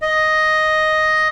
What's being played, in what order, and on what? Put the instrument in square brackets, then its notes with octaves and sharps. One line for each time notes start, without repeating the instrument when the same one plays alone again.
[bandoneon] D#5